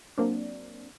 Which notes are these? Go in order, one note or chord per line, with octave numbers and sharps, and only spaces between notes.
F#3 A#3 C4 D4